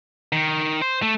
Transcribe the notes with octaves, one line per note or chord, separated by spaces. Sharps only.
D#3
C5
A3